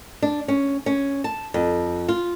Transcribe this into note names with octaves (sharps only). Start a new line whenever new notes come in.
D4
C#4
C#4
A5
F2
F4